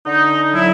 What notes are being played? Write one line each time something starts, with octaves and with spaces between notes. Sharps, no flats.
D3 D#4
F#3 E4